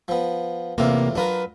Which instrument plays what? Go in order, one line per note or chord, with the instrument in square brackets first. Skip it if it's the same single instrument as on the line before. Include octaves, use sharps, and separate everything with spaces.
[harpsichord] F3 B3
[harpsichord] E2 A2 F4 [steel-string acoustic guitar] C3 A#3
[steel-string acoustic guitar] F#3 B4 [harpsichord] D4 F4 A#4